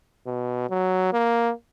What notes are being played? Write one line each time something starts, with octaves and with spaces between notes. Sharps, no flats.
B2
F#3
A#3